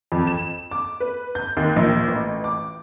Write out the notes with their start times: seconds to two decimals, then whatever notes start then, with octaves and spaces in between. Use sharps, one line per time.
0.12 F2
0.27 E7
0.71 D6
1.00 B4
1.35 G6
1.57 D#2
1.76 A#1
2.08 A1
2.44 D6